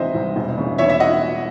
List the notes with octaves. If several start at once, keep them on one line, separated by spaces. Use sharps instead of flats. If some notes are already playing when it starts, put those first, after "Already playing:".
Already playing: C3 E3 G#3 C5 D#5 E5
C2
E1
C#3
E2 C#5 E5
E5
D#5 F#5